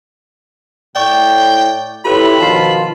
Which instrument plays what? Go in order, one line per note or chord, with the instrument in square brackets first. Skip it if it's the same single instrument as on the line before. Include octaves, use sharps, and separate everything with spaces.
[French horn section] A2 [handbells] D5 C#6 [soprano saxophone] G5
[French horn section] E4 G4 C#5 [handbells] F4 A4 B4 [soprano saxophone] B5
[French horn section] B2 D#3 F3 [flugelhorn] F4 [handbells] A5 C7